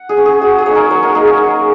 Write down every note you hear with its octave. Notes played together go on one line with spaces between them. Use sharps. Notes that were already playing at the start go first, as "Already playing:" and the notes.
Already playing: F#5
G#4
C#4
G#4
F#3 F#4
G#4
A#3 D#4 C#5
A#4
F#3 C#5
A#4
A#3 D#4 G#4
C#5
F#3